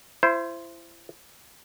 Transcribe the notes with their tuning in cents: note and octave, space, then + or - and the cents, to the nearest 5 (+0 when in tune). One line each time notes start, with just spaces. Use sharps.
E4 +35 C5 +0